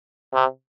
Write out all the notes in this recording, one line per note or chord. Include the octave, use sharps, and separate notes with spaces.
C3